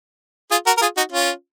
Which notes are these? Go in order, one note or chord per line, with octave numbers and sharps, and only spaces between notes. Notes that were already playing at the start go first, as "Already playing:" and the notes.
F4 G#4
F#4 A#4
A#4
F4 G#4
D#4 F#4
C#4 F4